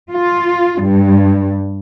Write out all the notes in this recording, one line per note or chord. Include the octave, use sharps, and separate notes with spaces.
F4
G2